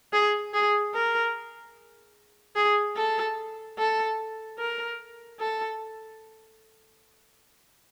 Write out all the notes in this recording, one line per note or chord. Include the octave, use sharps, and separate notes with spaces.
G#4
G#4
A#4
G#4
A4
A4
A#4
A4